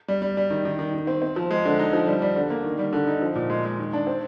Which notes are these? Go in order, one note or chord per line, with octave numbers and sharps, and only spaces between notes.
G3
G3
G3
D#3
D#3
D#3
D#3
C4
C4
F3
G#3
D3
D#4
F3
G3
G3
D3
A#3
D#3
G3
D3
D#4
F3
A#2
G#3
G#3
D#3
D4
C4